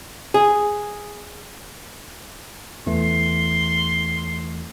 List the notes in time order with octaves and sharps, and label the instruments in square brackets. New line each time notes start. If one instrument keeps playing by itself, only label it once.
[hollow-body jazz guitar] G#4
[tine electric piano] E2 E3 A3 [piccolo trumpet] C6